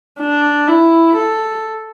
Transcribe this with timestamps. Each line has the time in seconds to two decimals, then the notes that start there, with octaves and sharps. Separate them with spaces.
0.20 D4
0.68 E4
1.16 A4